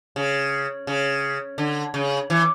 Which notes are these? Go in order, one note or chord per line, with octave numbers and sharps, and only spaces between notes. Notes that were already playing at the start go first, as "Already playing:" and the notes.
C#3
C#3
D3
C#3
E3